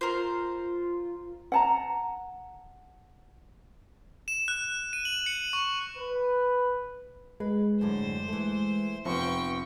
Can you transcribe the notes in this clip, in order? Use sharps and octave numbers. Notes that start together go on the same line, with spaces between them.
F4 A#4 C5
F#5 A5 A#5
E7
F#6
D#7
F#7
C#7
C#6
B4
G#3 B4
F#2 A2 D3 C5
E3 A3
F1 F3 B3 G5 C#6